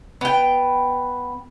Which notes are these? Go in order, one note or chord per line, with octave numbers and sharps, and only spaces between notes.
B3 G5